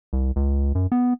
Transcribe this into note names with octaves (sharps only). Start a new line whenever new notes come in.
C2
C#2
F#2
B3